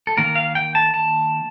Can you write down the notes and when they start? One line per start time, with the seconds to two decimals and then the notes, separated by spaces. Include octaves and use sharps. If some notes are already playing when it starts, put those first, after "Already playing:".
0.07 A4
0.17 D#3 A#3 A#4
0.36 F5
0.55 G5
0.75 A5
0.94 A5